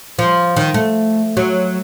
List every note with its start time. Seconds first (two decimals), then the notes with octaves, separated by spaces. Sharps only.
0.19 F3
0.56 D#3
0.74 A3
1.37 F#3